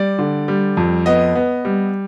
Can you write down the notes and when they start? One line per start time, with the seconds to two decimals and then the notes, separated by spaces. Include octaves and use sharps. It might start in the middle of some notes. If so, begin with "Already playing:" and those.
Already playing: G3 D5
0.19 D3
0.48 G3
0.77 F2
1.06 B3 D#5
1.35 B3
1.65 G3